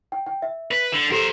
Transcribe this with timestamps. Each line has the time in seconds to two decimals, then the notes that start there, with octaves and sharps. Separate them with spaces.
0.12 G5
0.27 G5
0.42 E5
0.71 B4
0.92 D3 E7
1.12 G4 A4 A#4 C5